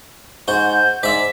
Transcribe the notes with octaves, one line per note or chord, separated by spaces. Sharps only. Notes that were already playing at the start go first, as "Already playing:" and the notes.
G#2 F#4 G6
G#2 D5 E5 B6